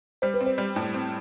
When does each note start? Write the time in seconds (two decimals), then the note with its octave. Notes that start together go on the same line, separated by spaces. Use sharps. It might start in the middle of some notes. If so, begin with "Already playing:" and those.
0.22 G3 C5
0.34 B4
0.41 C4
0.47 C5
0.58 G3
0.76 A2
0.94 C4